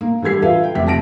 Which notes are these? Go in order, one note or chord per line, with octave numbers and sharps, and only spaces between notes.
A#3
E3 G3 A4 G#6 C7
F4 A4 B4 E5 F5
G5
F1 C3 G4 E5 B6
A3 A5 A#6 D7